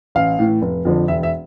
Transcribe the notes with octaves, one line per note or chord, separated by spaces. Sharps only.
A1 F5
A2 E3
F1
F2 D3 F3
E1 E5
E5